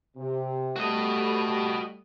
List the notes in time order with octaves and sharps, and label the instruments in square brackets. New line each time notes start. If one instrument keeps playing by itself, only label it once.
[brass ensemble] C3
[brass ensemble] G3 A3 [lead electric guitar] F#4 D#5